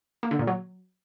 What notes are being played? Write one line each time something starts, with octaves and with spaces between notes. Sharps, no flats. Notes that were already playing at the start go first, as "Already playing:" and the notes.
A#3
D3
A#2
F#3